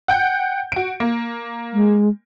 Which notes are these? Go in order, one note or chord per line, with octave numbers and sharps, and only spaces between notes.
F#5 G5 G6
F#4 D7
A#3
G#3